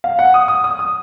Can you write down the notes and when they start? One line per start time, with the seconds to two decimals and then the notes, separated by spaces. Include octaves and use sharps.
0.04 F5
0.19 F#5
0.34 D#6
0.48 D#6
0.64 D#6
0.79 D#6